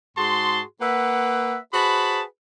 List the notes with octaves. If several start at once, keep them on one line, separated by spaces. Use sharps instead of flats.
G#2 F#4 G#4 A5 C6
A#3 B4 E5 F#5
F#4 G#4 B4 C5 A5 B5